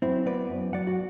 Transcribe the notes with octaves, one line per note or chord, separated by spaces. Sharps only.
F#2 C4 E4
B3 B4 D5
F#2
F#3 D5 F#5
F#4